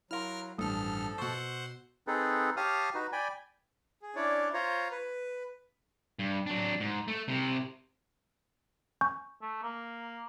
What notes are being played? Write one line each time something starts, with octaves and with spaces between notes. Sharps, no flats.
F#3 E4 A#4 F5 C6 F6
A1 G2 F3 A4 D#6 F6
B2 C5 F#5 C#6 E6
C4 D#4 G#4 A4 B4
G4 C#5 F5 A5 D#6 F6
D#4 F#4 B4
D5 G5 G#5 B5
G#4
C#4 D4 E4 C#5 D5
F4 C5 C#5 A#5
B4
G2
F#3 D4
G#2
A3
C3 E4
G#5 C#6 G6
A3
A#3